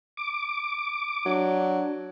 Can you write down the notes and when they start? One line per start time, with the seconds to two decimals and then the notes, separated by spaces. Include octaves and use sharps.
0.17 D6
1.26 F#3 D4